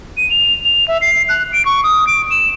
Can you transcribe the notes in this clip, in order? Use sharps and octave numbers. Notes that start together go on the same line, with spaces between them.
D#7
F7
F7
E5
C7
F#6
D7
C#6
D#6
D7
E7